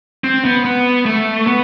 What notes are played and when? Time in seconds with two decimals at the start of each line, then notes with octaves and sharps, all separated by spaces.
0.24 C4
0.45 B3
0.65 B3
1.05 A3
1.47 B3